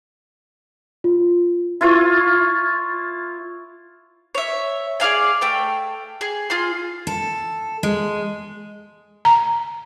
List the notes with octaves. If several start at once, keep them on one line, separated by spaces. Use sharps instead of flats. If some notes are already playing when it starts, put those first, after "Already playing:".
F4
E4 F4 C#5
C#5 E5
G#4 D5 F5 G#5
A3 G5 E6
G#4
F4 G#4 C6
A4
G#3
A#5